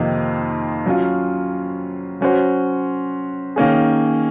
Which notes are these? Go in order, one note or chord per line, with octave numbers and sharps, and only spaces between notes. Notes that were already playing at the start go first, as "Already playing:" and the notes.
Already playing: F2 C3 D#3 A#3 D#4
F#3 C#4 F4
F#3 C#4 F#4 C5
D#3 A#3 C#4 G#4